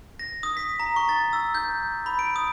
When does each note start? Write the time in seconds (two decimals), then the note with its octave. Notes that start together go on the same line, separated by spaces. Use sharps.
0.19 A#6
0.43 D#6
0.57 B6
0.80 A#5
0.96 C#6
1.09 A6
1.33 E6
1.55 G6
2.06 B5
2.19 D7
2.36 D#6